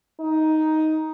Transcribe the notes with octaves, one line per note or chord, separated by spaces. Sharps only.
D#4